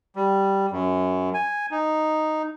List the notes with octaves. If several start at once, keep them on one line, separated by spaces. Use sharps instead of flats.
G3
F#2
G#5
D#4